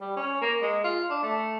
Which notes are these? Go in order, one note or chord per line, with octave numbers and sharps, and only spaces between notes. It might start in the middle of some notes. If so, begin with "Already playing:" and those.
G3
C#4
A#3
G#3
F4
D4
A3